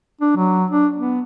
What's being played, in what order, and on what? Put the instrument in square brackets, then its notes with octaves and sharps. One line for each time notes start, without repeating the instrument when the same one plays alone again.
[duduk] D4
F#3
D4
B3